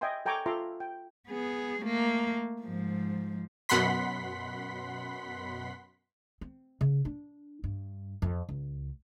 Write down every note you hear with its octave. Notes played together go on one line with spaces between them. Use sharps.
D#5 E5 G5 G#5 C6
A4 G5 G#5 A#5 C#6 D6
F4 A4 E5 A#5 C6 D6
G5
B3 G#4
A3 A#3
G#2 F3
F#2 B2 F#5 B5 C6 B6
C4
C#3
D4
G2
F2
C#2